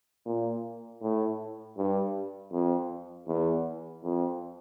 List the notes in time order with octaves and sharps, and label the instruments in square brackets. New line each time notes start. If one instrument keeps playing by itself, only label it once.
[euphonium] A#2
A2
G2
F2
E2
F2